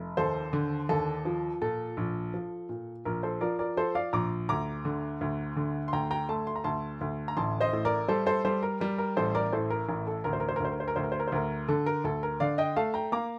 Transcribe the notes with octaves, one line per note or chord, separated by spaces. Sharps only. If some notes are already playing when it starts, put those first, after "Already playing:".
Already playing: F1
D#2 A4 C5
D3
D#2 A4
F3
A#2 A4
A#1
F3
A#2
A#1 A#4
A4 C5
F3 A#4 D5
A#4 D5
F3 A4 C5
D5 F5
A#1 A#5 D6
D2 A#5 D6
D3
D2
D3
C6
D2 G5 A#5
G5 A#5
A3 A5 C6
C6
A#5
D2 A5 C6
D2
A#5
A1 A5 C6
C5 D#5
A2
A#4 D5
G3 A4 C5
A4 C5
G3 A4 C5
A#4
G3 A#4
A#4
A1 A4 C5
A#4 D5
A2 A4 C5
A#4
A1 A#4
A4
D2 A#4
C5
A#4
C5
A#4
D2 C5
A#4
C5
A#4
D2 C5
A#4
C5
A#4
C5
D2 A#4
D3 A4
A#4
D2 A4
A#4
D3 D5 F5
D#5 G5
A3 F5 A5
G5 A#5
A#3 A#5 D6